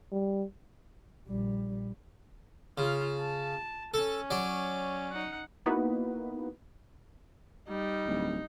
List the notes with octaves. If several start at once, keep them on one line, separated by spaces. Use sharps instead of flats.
G3
A#1 G3
C#3 F4
A5
C#4 A4
F#3 D5
D#4 F#5
A#3 B3 D#4 E4 F#4 B4
G3 D#4
D1